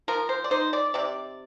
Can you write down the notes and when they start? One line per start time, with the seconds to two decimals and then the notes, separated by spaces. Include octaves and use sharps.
0.08 F3 A#4
0.29 C5
0.44 D5
0.51 D#4 C5
0.73 D5
0.94 C3 D5